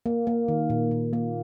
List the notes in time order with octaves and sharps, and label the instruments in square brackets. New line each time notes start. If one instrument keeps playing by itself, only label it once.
[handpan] A#3
A#3
D#3
A#2
A#2
A#3